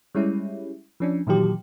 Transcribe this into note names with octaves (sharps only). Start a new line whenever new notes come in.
G3 G#3 C#4 E4
F3 C#4 D4
A#2 D#3 E3 F#3 G4